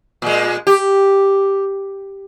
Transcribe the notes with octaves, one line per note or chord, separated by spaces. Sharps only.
A#2 G#3
G4